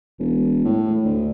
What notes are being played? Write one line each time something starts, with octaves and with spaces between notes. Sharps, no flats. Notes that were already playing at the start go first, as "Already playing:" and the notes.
E1
A2
D2